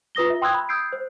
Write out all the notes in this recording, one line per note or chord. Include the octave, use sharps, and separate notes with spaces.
F4 B4 D#6 A#6 G7
F4 E5
G5 C6 D#6 E6 F#6 G#6
B5
D#6 E6 G6 G#6 C7 D7
C5